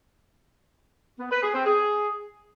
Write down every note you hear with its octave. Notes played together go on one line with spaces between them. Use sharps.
B3
B4
G#4
C4
G#4